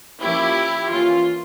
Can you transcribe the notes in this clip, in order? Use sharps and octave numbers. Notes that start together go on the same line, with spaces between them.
F3 A#3 C#4 E4 G4
E3 A#3 C#4 F4